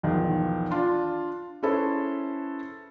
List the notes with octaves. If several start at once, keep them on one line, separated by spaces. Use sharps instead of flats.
B1 E2 D#3 F3
D4 F4
C#4 E4 G#4 A4 B4 C5